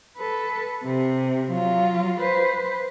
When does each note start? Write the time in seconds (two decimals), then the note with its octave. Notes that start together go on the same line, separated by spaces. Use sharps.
0.17 A4 B4
0.84 C3
1.50 F#3 F4
2.20 B4 C5